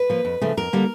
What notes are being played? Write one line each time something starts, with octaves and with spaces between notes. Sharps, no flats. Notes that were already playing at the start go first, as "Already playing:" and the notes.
Already playing: B4
F3 A#3
F2
C#3 F3 A3
F2 A#4
D3 G3 A#3